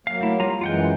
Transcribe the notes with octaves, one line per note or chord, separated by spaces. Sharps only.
F#3 A#3 F5
A3 E4
G3 F4 A#5
F#2 E3 G#3 F4 F#5 G5